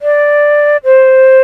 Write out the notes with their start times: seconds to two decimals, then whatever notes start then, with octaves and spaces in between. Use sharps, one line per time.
0.02 D5
0.85 C5